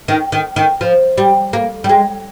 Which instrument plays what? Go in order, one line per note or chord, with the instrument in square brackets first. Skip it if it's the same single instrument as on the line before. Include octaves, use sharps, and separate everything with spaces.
[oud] D#3
D#3
D#3
F3
G3
A#3
G3
G#3